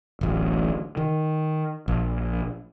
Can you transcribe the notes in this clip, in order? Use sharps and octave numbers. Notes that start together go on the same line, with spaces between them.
D1 A1
D#3
A#1